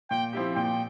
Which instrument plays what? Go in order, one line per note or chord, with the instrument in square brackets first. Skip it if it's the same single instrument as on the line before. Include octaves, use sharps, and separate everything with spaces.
[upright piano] A#2 [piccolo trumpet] G5
[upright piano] F3 C4 E4 G4
[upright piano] A#2 [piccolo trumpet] G5